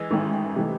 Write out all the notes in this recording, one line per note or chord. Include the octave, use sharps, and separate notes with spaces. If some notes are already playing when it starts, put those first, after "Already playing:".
Already playing: E3 G#3
A1 G#2 D#3
C3 E3 A3